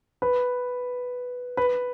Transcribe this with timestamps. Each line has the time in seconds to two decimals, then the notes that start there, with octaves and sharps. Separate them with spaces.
0.22 B4
1.57 B4